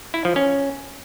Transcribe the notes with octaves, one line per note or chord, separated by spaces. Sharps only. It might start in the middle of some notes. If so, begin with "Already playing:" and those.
E4
F3
C#4